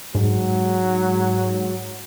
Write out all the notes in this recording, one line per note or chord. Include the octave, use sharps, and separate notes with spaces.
G#2 F#3